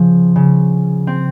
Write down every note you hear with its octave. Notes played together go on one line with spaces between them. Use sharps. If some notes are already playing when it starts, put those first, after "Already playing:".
Already playing: C#3 F3
C#3
C4